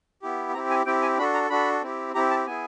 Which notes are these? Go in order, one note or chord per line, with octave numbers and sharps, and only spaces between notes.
B3 E4 G4
C4 E4 G4 A#5
G#5
C4 E4 G4 G5
G#5
D4 F#4 A4 B5
A#5
D4 F#4 A4 B5
C4 E4 G4
C4 E4 G4 A#5
A5
B3 E4 G#4 G#5